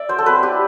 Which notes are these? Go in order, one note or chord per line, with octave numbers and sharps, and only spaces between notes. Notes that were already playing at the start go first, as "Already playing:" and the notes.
Already playing: D5 E5
F#3 C5
A4
C4 B4
E4 G4